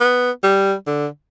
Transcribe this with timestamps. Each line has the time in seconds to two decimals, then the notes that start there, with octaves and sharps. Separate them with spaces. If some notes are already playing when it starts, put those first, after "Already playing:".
0.01 B3
0.43 G3
0.87 D3